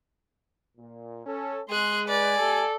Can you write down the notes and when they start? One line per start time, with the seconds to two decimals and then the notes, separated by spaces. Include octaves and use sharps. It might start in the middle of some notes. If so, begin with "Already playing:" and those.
0.78 A#2
1.26 C#4 A4
1.70 G#3 G#4 C6 F#6
2.08 B4 D5 G#5
2.39 A3 G4 A4